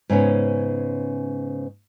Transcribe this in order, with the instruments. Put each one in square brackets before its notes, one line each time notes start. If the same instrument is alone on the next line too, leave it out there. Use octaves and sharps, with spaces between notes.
[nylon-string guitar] G#2 C#3 B3 C#4